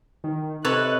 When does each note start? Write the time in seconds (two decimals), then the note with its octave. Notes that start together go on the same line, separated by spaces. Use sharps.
0.24 D#3
0.65 C3 A4 B4 C#5 D#5 F#6